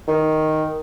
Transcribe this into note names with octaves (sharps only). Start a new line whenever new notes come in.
D#3